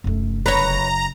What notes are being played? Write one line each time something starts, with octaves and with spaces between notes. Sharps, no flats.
F1 F#2 A3
F#1 B4 C#5 A#5